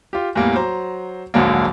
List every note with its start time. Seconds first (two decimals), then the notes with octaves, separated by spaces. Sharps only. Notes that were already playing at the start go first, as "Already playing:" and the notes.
0.13 F4 G4
0.35 E2 A2 G3 A#3
0.55 F#3 C5 A#5
1.34 D1 A#1 G#2 D3 F#3 A#3